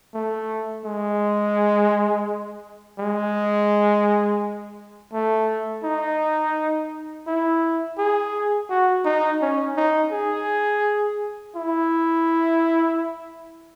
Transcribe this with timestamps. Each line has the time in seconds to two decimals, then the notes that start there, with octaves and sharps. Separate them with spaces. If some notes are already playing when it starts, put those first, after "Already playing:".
0.14 A3
0.85 G#3
2.99 G#3
5.13 A3
5.84 D#4
7.27 E4
7.98 G#4
8.70 F#4
9.05 D#4
9.42 C#4
9.77 D#4
10.12 G#4
11.56 E4